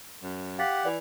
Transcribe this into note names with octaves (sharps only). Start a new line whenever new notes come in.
F#2
G4 F5 F#5 A6 B6
E3 B4 D5